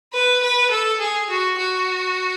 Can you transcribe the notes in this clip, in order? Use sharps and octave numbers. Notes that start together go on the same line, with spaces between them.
B4
B4
A4
G#4
F#4
F#4